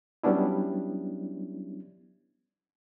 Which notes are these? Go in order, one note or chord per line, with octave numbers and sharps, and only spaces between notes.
F#3 G3 B3 C#4 D4 E4